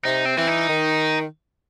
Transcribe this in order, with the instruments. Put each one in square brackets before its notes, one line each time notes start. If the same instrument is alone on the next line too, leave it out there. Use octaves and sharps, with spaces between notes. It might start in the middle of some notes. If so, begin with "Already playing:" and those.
[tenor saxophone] C3 [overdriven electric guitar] D#4
[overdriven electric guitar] C4
[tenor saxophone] E3 [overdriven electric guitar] C4
[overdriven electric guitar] D#4
[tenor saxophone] D#3